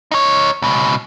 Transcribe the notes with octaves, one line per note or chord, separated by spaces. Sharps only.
D#4 C#5
C#2 B2